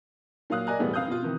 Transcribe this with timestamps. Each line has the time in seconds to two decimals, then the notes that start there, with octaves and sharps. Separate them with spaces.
0.50 A#2 F#3 F5 D#6 F#6
0.67 A#4 D5 D#5 G#5 A#5 F#6
0.79 E1 A2 G3 B3 G#4
0.93 F1 C4 F5 D#6 F#6 G6
1.08 B2 F4
1.22 C3 D#3 E3